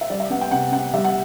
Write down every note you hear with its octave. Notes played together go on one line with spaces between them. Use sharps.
E5
G3 D5
E5
B3 F#5
G5
C3 F#5
C3 F#5
G3 E5
F#5